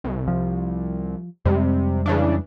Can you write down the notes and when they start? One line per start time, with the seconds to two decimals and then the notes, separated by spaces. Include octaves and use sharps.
0.04 C2
0.28 F3
1.45 F2 C3 G3 G#3
2.06 C#3 E3 D4